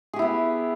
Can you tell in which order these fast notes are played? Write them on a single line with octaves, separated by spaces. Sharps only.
G#4 G4 E4 B3